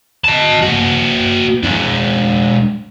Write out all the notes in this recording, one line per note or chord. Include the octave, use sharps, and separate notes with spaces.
D#5 A5
A#3 F#4
G#3 D4